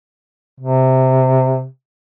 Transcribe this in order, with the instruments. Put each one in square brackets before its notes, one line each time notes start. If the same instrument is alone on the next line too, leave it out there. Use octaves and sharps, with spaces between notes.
[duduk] C3